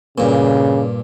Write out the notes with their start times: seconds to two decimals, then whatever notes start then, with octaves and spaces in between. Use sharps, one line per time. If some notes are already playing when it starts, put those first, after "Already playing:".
0.18 G2 A#2 C#3